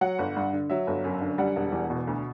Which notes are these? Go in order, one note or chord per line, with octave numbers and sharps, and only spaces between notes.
F#3 F#5
G1
G2
D3
F#3 E5
G1
F#2
D3
G3 F#5
E1
E2
B2
D2